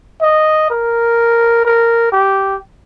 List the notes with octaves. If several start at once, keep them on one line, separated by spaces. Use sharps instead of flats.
D#5
A#4
A#4
G4